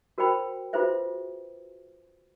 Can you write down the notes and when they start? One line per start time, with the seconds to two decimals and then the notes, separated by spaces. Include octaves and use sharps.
0.18 F#4 A#4 C5 G5 B5
0.73 F4 F#4 G#4 B4 C5 E5